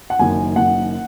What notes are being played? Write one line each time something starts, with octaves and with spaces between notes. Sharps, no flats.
F#5
F#1 F#2 D#3 G#5
F#1 F#2 D#3 F#5